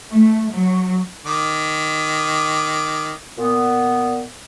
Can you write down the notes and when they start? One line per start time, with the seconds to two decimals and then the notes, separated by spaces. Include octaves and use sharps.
0.11 A3
0.53 F#3
1.26 D#3 D6
3.38 A#2 B3